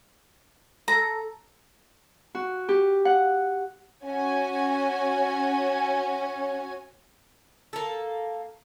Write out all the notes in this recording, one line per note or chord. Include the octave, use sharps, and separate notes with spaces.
A4 A#5
F#4
G4
F#5
C#4 F#4 G#5
A#3 A4